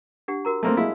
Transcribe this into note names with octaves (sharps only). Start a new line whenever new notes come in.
D4 G4 F#5
F#4 A#4 A#5
A3 A#3 C4 A5 C6
G#3 E4 F5